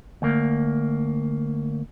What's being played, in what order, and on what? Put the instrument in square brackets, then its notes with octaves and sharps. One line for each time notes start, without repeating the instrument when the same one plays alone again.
[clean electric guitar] D2 A#3